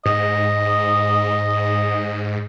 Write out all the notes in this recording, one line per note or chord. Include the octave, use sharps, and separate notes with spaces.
G#2 D#5